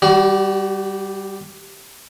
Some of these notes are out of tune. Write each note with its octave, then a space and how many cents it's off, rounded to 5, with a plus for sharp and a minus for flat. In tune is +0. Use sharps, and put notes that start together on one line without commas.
G3 +0 F#4 +40